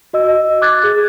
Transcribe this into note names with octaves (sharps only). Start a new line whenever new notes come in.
F#4 D#5 E6
D6 F#6 G#6 A6
G#4